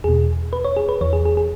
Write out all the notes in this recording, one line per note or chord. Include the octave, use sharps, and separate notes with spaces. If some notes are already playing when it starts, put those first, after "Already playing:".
E2 B2 G#4
B4
C#5
G#4
B4
E2 E3 C#5
G#4
G#4
G#4